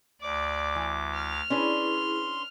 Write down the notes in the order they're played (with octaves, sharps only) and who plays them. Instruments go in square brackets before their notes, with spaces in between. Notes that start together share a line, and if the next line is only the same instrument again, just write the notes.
[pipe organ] D2 D6 [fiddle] D5
[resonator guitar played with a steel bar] E3
[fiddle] F6
[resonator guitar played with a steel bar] C#4 D4 B4 [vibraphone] E4 G#4 [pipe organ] C6